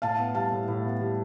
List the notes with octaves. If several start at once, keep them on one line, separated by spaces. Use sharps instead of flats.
A2 F5 A5
B3
G3 F5 A5
A2
A2
B3
G3